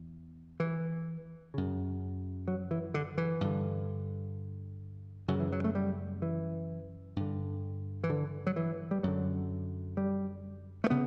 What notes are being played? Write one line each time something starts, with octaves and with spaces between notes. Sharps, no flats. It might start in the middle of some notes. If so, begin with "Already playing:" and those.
Already playing: E2
E3
F#2 C#3
F#3
E3
D3
E3
G2 D3
F#2 C#3 F#3
E3
F#3
A3
G3
E3
G2 D3
E3
D3
F#3
E3
G3
F#2 D3 F#3
G3
A3
C#3 B3